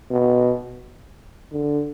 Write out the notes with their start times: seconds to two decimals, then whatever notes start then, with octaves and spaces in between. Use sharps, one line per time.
0.10 B2
1.52 D3